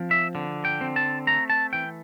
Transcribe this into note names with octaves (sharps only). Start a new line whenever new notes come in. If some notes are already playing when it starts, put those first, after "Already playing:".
Already playing: F3 C4
E5
D3
G5
C4
A5
A3 A#5
A5
E3 G5